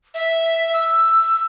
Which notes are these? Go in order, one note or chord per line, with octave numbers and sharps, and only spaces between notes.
E5
E6